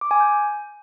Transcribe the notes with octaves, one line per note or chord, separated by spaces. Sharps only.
D6
G#5
G6